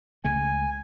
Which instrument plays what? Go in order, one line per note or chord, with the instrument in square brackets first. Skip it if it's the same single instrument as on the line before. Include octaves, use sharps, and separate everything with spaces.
[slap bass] C#2 C#3 A3 [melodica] G#5